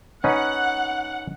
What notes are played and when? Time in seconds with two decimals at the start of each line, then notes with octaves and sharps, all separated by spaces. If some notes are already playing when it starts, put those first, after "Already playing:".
0.24 C#4 D#4 B4 F#5